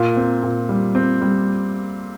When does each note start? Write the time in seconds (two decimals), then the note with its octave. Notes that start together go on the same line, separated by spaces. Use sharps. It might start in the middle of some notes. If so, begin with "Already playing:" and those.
Already playing: A#2
0.17 C4
0.43 A#2
0.69 G3
0.95 C4
1.21 G3